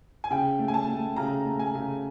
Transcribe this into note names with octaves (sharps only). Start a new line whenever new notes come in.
G#5
C#3 G5
A3
G#5
A5
A3
C#3 A#5
A3
G#5
C#3